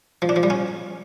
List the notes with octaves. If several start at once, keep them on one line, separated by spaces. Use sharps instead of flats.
F3
D4
F3
G3
C#4